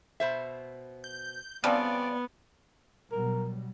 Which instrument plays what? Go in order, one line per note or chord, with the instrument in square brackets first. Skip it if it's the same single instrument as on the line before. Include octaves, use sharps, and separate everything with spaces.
[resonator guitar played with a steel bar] B2 C5 E5
[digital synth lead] G6
[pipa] C#3 F3 G3 [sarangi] B3 [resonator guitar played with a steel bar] C4 B4 [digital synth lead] D5
[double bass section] B2 F#3 G3 [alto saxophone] A#4